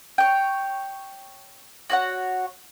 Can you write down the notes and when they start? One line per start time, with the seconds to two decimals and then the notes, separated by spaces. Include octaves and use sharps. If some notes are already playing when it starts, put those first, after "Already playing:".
0.18 C#5 G5
1.90 F#4 C#5 F#5